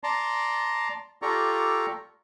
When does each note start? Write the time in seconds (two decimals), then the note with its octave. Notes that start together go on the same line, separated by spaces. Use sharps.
0.04 D5 A5 A#5 C6
1.22 F4 G4 A4 D5 A#5 C#6